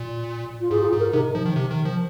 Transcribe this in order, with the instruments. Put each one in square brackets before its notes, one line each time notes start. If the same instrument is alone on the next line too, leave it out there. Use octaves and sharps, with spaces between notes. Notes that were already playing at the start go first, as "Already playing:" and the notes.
Already playing: [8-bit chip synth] A#2
[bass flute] F4
[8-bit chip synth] G#2 [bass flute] G#4
[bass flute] F4
G#4
[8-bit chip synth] G#2
[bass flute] A#4
[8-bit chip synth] C3 [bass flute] D#4
[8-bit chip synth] F3
D#3
C3
D#3
F3